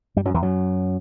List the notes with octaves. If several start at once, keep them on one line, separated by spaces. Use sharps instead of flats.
G2 G3
F#2 F#3
E2 E3
F#2 F#3